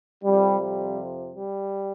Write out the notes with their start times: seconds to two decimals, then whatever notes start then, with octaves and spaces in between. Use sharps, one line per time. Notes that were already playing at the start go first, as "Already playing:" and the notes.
0.23 F2 C3 F3 G3
0.60 G3
1.34 G3